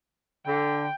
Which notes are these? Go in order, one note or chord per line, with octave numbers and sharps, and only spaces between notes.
D3 G5